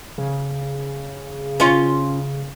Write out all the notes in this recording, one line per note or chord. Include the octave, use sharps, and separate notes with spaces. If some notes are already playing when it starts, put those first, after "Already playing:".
C#3
C#4 F4